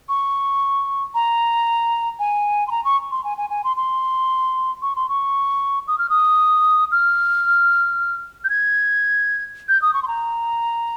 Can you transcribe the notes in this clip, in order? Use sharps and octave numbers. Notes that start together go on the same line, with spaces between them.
C#6
A#5
G#5
C6
A#5
C#6
C6
G#5
G#5
G#5
C6
C6
C#6
C6
C#6
D#6
F6
D#6
F6
G6
G#6
G6
D#6
C#6
C6
A#5